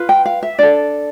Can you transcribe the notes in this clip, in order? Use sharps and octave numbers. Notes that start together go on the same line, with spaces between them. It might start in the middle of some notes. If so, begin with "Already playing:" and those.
Already playing: F4 B4
G5
F5
E5
D4 A4 D5